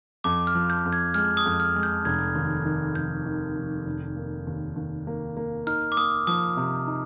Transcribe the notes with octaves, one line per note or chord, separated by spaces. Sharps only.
F2 D6
F6
F3
G6
F2
G#6
G#3 F6
D#6
F2
F6
G#3
G6
F1 G#6
D#2
D#3
F1 G6
D#3
F1
F1
A#3
D#2
D#2
A#3
A#3
D#4 F6
D6
A#3 D#6
F3 D#6
C3
D#4